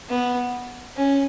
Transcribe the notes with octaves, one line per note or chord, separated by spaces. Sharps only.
B3
C#4